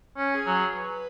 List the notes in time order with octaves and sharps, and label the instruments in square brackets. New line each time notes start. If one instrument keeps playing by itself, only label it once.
[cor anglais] C#4
[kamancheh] G#4
[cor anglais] F#3
[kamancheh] B4